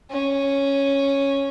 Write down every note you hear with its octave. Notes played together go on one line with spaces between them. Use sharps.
C#4